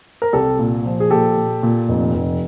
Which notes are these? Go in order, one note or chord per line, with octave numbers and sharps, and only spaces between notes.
A#4
C2 G4 A4
A#2
F3
G#4
A#2 G4 A4
A#2
A#2
F1
F1